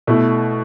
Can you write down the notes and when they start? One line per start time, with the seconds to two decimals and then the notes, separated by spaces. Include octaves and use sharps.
0.07 B2 A3 E4